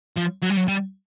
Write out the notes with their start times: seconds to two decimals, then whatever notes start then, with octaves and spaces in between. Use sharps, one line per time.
0.16 F3
0.42 F#3
0.50 G3
0.57 F#3
0.68 G3